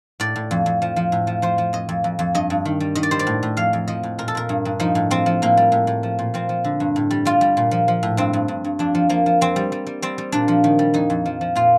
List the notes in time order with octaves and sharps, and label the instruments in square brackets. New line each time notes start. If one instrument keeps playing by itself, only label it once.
[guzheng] A2 D5
A2
F2
F2
F3
F3
A2
F3
F3 C5
F3
F2 D#5
F2
F2
F2
G2 D#5
G2
D#3
G3
D#3 D#5
D5
G3 C5
D5
A2
A2
F2 F5
F2
F3 D#5
A2
A#2 A#4
A4
A#2 A#4
G2
G2
F3 D#4
A2
F3 C4
F3
A2 A#3
G3
A2
A2
F3
A#2
F3 C4
F3
D3
G2
A2
G3
G3 F4
G3
A#2
F3
F3
A2
G2 C4
G2
G2
G2
F2 D4
F3
F3 A#3
F3
F2 C4
G3
G3
G3
G3 C4
G3
A#2 D4
F3
D#3
G3
F2 D#4
F2
F3
F3
A#2 F4